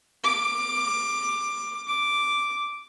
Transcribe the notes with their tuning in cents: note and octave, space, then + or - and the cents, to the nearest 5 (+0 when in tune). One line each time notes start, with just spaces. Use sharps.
D6 +15
D6 -5